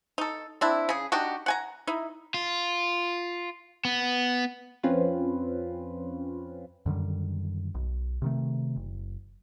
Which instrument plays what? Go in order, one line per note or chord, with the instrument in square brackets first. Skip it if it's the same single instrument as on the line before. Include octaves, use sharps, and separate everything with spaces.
[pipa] D#4 A4
C4 D4 E4
C#3 G#4
D4 D#4 F#4 G4
F#5 G#5 A#5
D#4 E4
[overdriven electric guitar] F4
B3
[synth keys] F2 C4 C#4 F4 B4
[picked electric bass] F#2 D3 D#3 G3
B1
C3 D#3 A3
F#1